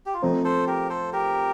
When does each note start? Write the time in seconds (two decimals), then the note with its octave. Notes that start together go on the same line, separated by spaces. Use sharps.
0.06 G4
0.14 F4
0.22 F3 A3 C4 D#4
0.44 A4 C5
0.67 G4 A#4
0.90 A4 C5
1.13 G4 A#4